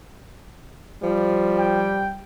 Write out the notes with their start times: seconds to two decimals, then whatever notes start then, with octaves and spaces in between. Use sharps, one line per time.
1.03 F3 G3
1.59 G5